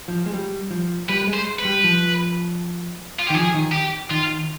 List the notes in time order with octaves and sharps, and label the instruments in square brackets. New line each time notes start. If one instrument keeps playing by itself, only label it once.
[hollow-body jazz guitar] F3
G#3
G3
F3
[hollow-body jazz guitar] G3 [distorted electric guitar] B4
[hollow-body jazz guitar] G#3
[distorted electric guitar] C5
B4
[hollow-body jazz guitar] G3
F3
[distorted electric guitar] F4
G4
[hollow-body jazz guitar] D#3
[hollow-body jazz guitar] F3 [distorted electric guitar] G#4
[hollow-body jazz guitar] D#3
[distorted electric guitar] G4
[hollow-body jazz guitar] D#3 [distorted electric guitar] F4